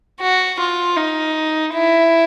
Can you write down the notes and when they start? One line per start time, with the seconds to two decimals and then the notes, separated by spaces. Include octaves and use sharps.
0.21 F#4
0.59 F4
0.97 D#4
1.74 E4